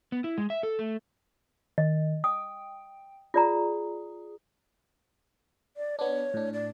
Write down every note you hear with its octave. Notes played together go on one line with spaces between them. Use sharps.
B3
E4
G#3
E5
A4
A3
D#3 D#5
G5 D#6
F4 G#4 D5 A#5
D5
B3 D4 C#5
A2 D4
D5